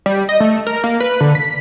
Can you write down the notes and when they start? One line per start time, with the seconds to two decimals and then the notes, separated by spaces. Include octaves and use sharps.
0.06 G3
0.29 D#5
0.40 A3
0.67 A#4
0.84 A#3
1.00 B4
1.21 D3
1.35 B6